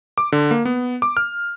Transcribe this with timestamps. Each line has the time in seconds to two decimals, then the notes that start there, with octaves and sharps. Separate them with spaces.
0.18 D6
0.32 D3
0.51 A#3
0.65 B3
1.02 D6
1.17 F6